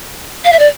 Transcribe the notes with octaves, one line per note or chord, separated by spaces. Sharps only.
F5
E5
D5